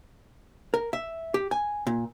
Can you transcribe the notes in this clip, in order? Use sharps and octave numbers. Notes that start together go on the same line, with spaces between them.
A#4
E5
G4
G#5
A#2